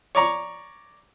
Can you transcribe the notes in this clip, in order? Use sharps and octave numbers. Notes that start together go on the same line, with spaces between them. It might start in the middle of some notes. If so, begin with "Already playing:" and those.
C#5 D5 A#5 C#6